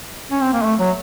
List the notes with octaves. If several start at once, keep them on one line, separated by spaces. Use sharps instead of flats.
C#4
C4
A#3
A3
F#3